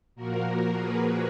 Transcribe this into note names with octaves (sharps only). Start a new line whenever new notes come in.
A#2 F3 A#3 F#4 A#4
G#4 B4